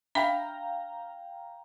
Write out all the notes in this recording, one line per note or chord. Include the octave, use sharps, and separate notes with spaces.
D4 E5 F5 G5 A#5 B5